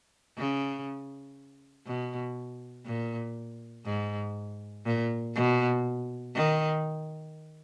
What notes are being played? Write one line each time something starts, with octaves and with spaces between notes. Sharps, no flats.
C#3
B2
A#2
G#2
A#2
B2
D#3